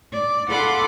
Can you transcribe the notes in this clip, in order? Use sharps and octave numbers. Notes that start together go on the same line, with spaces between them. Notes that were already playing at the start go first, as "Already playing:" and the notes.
D5
F4 A4 F#5 B5 C6 D6